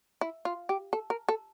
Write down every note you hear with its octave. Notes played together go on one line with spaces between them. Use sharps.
E4
F4
G4
A4
A#4
A4